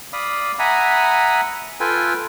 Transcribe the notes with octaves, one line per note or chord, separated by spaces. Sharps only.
D5 F5 B5 D#6
E5 F#5 G#5 A#5 B5 D#6
F4 A4 B4 G5 G#5